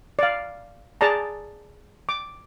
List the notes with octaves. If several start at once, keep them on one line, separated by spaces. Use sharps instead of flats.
D5 F5
G#4 D5 A5 A#5
D6